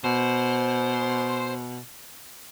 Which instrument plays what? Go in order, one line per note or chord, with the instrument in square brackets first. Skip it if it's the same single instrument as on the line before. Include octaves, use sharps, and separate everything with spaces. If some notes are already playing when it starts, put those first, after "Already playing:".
[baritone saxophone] B2 [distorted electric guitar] C5